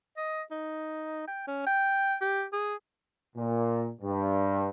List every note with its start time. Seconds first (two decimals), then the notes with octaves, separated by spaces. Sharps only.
0.17 D#5
0.51 D#4
1.27 G5
1.47 C#4
1.66 G5
2.21 G4
2.53 G#4
3.36 A#2
4.02 G2